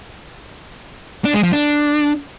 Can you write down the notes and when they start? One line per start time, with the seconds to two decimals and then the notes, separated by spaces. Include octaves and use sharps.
1.25 D4
1.34 G#3
1.43 F3
1.53 D4